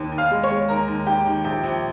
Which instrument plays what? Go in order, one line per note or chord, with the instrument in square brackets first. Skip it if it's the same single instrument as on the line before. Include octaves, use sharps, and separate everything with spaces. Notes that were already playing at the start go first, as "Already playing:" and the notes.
Already playing: [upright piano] D#2
D#2
F5 F6
G#3
C#5 C#6
G#3
D#2 A#4 A#5
D#2
D#2 G4 G5
D#3
A#1 G4 G5
A#1